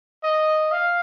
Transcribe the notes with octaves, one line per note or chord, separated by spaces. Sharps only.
D#5
F5